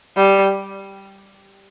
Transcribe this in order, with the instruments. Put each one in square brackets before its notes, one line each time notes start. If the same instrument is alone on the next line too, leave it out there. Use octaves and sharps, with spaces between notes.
[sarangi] G3